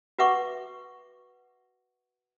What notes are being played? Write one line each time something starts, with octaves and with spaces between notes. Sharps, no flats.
F#4 B4 E5 F#5 C#6 D6